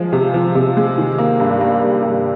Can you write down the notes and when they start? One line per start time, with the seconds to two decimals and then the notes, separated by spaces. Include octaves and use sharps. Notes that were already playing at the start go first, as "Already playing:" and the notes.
Already playing: F3 G#3
0.13 C3
0.34 F3
0.55 C3
0.77 G#3
0.98 D#3
1.18 A#3
1.40 G2
1.61 A#3
1.82 A#3
2.03 G2